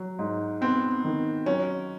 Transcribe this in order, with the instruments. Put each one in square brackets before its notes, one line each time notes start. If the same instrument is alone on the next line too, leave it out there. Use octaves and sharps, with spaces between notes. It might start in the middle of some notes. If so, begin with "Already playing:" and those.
Already playing: [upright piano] F#3
G#2
[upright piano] B3 [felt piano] C4
[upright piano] D#3
[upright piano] F#3 [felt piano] C#4